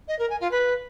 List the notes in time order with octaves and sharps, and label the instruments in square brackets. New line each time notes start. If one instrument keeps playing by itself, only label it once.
[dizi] D#5
A#4
G#5
F4
B4